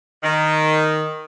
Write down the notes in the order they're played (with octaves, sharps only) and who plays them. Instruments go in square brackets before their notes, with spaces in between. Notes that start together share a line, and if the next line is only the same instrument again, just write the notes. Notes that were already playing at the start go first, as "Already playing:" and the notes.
[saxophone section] D#3